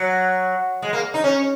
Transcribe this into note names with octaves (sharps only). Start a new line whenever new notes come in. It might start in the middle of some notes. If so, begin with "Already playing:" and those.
Already playing: F#3
G#3
A#3
D#4
C#4